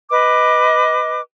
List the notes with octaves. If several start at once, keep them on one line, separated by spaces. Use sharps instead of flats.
B4 D#5 D6